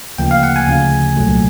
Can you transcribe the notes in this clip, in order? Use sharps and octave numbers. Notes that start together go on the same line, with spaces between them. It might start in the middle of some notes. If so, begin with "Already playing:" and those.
D2 C#3 F3 A#3 G5
F5
F#5
G#5
D2 C#3 F3
C2 A#2 F#3 A3